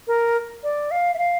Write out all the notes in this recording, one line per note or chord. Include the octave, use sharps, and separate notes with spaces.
A#4
D5
F5
E5
F5